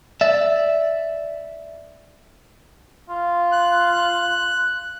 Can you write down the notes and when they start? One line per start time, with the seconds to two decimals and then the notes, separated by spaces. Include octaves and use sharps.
0.21 D5 E5
3.10 F4
3.52 F#6